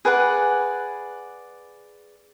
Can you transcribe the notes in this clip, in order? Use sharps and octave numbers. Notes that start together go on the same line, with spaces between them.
G#4 B4 D5 F#5